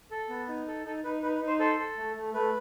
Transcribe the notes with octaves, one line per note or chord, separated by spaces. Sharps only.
A4
B3
D#4
A4
D#4 A4
D#4 B4
D#4 B4
B4
D#4
C5
A4 C5
A4
A3
A3
A3 B4